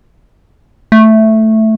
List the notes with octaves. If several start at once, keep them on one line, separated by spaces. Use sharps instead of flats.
A3